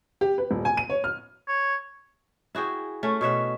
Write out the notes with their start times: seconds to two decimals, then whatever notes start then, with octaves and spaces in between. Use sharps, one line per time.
0.21 G4
0.38 B4
0.51 D#1
0.65 G#5
0.77 D#7
0.90 C#5
1.04 F6
1.48 C#5
2.55 E4 F#4 G#4 G5
3.03 A3 C#4
3.21 B2 C#5 E5 F#5